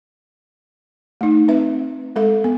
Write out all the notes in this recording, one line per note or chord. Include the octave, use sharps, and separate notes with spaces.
A3 D#4
C4 B4 E5
G#3 A4 E5
B3